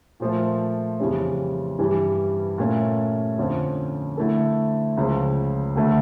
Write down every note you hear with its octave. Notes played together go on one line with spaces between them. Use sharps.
A#2 F3 A3
F2 C#3 E3 G3 C#4
G2 E3 G3
A#2 A3 C#4
F2 D3 F3 C#4
D3 A3 E4 A4
C#2 C#3 F3
D2 D3 A3